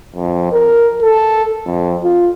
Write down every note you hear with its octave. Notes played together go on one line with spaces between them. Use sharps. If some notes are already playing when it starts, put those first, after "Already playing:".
F2
A#4
A4
F2
F4